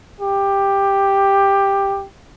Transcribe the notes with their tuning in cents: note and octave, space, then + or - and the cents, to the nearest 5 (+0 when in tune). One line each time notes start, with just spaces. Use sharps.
G4 +10